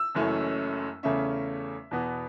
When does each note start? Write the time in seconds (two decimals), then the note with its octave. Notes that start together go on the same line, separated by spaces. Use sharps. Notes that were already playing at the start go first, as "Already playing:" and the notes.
Already playing: E6
0.15 F#1 F#2 E3 A3 C#4
1.03 E2 C#3 A3 C#4 E5
1.91 E2 B2 B3